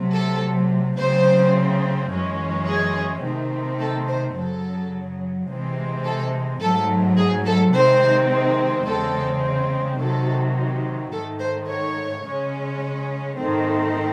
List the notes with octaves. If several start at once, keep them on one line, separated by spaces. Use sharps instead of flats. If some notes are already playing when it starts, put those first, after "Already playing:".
Already playing: C3 F#3 A3
A4
C#3 F#3 A3 C4 C5
F#2 E3 G#3 C#4
G#4
C3 D#3 A3 C4
A4
C5
F#2 C#3 F#3 A4
C3 E3 G#3 C4
A4
G#2 F#3 A3 A4
G#4
A4
C3 D#3 G#3 C4 C5
E2 C#3 G#3 C4 A4
C3 D#3 F#3 A4
G#2 D#3 A3 A4
C5
C#5
C#3 G#3 C#4
G#2 D#3 A3 C4